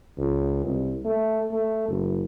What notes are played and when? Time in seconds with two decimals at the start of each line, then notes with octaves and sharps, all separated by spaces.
0.18 C#2
0.65 C2
1.05 A3
1.52 A3
1.88 F#1